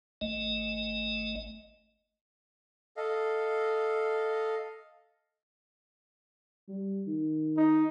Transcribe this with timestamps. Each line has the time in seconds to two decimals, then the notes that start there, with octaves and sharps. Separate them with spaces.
0.21 G#1 A3 D#5
2.97 A4 D#5 F5
6.68 G3
7.07 D#3
7.57 D#4